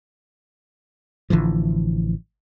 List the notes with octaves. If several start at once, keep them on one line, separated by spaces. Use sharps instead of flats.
A1 D3 E3 F3